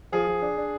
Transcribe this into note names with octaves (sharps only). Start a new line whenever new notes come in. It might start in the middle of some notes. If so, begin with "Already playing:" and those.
F3 G#4
F3
D4
D4